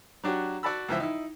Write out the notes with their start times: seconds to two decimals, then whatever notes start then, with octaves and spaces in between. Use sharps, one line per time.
0.24 F#3 D4 F#4 G4
0.63 F#4 D5 F#5 A5 B5 E6
0.88 C#2 E3 F3 E5 E6
1.00 D#4 E4